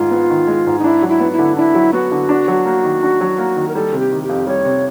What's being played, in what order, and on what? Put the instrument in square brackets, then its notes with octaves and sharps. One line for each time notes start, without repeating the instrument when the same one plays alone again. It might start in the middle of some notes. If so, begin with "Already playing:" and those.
Already playing: [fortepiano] G#2 D#3 G#3 [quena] F4
[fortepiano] B3
D#3
G#3
G#2
[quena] D#4
[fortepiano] D4 [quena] E4
[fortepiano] F#3
[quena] E4
[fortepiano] B3
[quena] E4
[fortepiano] D3
[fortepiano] D4 [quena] E4
[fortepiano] F#3
[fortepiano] B3 [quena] F#4
[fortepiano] D3
D4
F#3
A#3
D#3
D4
F#3
A#3
D#3
[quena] A#4
[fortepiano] G3 [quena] A4
[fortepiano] C3
[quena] G4
[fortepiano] D#3
[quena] G4
[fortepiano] F2
[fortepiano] G3 [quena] C#5
[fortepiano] C3